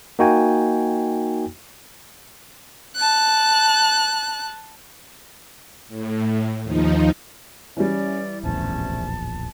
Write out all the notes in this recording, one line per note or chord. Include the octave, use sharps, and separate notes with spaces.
A#3 D#4 F#4 G5 G#5
A5 F#6
A2
D#2 F3 D#4
E3 G3 C#4 D5
D1 A#1 E2 C3 A3 C#4 A5